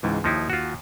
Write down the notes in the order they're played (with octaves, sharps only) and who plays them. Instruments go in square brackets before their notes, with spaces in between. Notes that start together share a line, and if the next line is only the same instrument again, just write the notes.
[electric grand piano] C#2 G#2 E3
[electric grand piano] D#2 [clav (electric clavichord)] F3 D#4 E4
[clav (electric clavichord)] F4 F#4